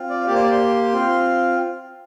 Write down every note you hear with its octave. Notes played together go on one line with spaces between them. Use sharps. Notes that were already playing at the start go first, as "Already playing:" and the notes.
Already playing: C4 F4
D5
F5
A#3 G4 D5
C5
D5
C6
C4 F4